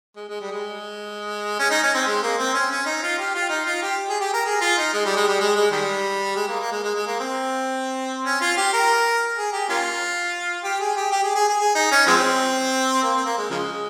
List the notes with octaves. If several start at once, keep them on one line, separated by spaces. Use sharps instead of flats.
G#3
G#3
G3
G#3
C#4
D#4
C#4
C4
G#3
A#3
C4
C#4
C#4
D#4
F4
G4
F4
D#4
F4
G4
G#4
G4
A#4
G#4
F4
D#4
G#3
G3
G#3
G3
G#3
G#3
D#3 G3
G#3
A#3
A#3
G#3
G#3
G#3
A#3
C4
C#4
F4
G4
A#4
G#4
G4
A#3 C#4 F4
G4
G#4
G4
G4
G#4
G#4
G#4
G#4
D#4
C#4
F3 G#3 C4
A#3
C4
A#3
G#3
C#3 F3 G#3
G#3